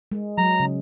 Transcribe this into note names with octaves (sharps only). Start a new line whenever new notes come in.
G#3
F#3 A#5
C#3